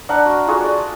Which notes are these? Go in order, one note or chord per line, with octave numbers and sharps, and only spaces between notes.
D4 A#4 E5 F#5
F#4
F4 F#4 G#4 A4
D5